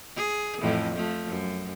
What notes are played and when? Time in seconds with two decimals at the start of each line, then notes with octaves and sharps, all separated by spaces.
0.16 G#4
0.62 F2 A2 E3
0.94 F3 A3
1.27 F#2